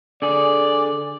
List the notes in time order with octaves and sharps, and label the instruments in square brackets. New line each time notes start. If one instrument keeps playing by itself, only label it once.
[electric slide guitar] D3 G#4 [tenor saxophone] D5